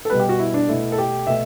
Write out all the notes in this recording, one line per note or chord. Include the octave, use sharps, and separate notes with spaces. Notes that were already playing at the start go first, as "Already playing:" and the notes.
A4
B2 G3 B3 B4
G4
F#4
E4
D4
B2 A3 E4
A4
G4
B2 A3 E5